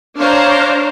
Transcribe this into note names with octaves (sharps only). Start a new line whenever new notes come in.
D4 C5 C#5 F5 A#5